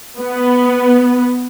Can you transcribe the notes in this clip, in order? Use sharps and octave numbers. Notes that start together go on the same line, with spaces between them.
B3